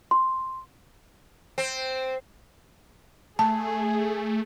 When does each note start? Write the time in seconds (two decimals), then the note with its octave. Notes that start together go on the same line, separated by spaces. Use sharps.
0.11 C6
1.58 C4
3.39 A3 G#4 A5